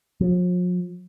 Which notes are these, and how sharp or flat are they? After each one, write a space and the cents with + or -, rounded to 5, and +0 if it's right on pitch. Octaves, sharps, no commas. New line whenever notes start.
F3 +45